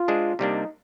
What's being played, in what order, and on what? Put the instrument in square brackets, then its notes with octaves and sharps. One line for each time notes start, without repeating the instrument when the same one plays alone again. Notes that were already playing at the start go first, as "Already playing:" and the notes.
Already playing: [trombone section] F4
[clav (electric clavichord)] G#3 D4 G#4 C5
[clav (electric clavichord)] C3 G3 A#3 D4 [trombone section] D#4